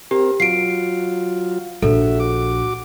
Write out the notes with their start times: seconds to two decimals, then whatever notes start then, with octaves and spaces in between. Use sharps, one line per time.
0.11 C4 G4 A#4
0.40 F#3 F4 C7 D7
1.82 A#1 F#4 A4 E5
2.20 F#4 D6